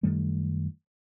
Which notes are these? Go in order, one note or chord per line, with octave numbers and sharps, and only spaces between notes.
F#2 D#3 G3 A3